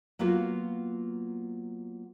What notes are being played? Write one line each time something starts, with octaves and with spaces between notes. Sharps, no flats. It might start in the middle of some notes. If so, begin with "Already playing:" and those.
F#3 A#3 B3 F4 F#4